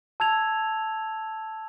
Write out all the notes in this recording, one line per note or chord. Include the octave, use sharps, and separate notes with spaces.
A5 E6 G#6 F7